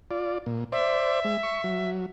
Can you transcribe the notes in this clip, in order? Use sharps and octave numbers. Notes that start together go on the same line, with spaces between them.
F4 D5
A#2
C5 D5 E5
G#3
C#6
F#3